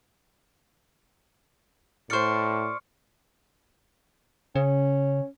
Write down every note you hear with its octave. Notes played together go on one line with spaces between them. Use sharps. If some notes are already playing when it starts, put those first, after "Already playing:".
A2 C5 D5 C#6 F6 C#7
C#3 C#4